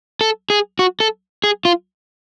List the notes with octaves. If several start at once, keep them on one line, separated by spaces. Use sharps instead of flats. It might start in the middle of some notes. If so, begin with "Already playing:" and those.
A4
G#4
F#4
A4
G#4
F4